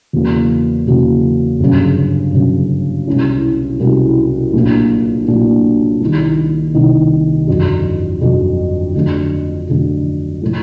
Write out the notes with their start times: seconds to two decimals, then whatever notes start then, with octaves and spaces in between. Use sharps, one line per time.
0.13 E2 C#3 F#3 A#3
0.87 E2 C#3 F#3 A#3
1.60 G1 F#2 C#3
2.33 G1 F#2 C#3
3.07 C2 B2 G#3 C#4 E4
3.80 C2 B2 G#3 C#4 E4
4.53 A#1 A2 F#3 A#3 D4
5.27 A#1 A2 F#3 A#3 D4
6.01 C2 C3 D#3
6.74 C2 C3 D#3
7.47 G1 F2 D3 F#3
8.21 G1 F2 D3 F#3
8.95 F2 D3 F#3 A3
9.68 F2 D3 F#3 A3
10.42 A2 F3 G#3